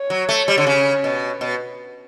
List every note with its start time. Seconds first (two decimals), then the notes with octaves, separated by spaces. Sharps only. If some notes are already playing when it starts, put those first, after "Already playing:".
Already playing: C#5
0.10 F#3
0.29 A3
0.48 G3
0.58 D3
0.67 C#3
1.04 B2
1.41 B2